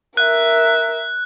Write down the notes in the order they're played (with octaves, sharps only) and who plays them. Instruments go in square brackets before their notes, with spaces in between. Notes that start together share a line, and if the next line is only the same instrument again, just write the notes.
[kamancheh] A#4 E5 [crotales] F#6